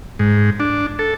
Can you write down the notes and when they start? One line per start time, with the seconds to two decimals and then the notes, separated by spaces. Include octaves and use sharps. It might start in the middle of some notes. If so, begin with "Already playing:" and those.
0.19 G#2
0.60 D4
0.99 A4